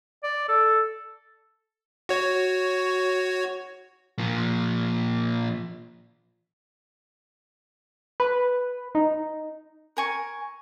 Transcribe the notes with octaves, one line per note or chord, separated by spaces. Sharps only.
D5
A4
F#4 C#5
A#2 F3
B4
D#4
A#4 G#5 C#6